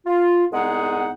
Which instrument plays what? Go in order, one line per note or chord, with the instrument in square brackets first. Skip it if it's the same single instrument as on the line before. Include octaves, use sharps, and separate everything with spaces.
[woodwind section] F4
C2 G#3 B3 D#4 G#4 F#5